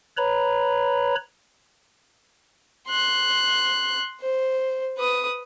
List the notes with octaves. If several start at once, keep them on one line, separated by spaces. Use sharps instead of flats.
B4 C#5 A#5 B5
C6 F#6
C5
B4 D#6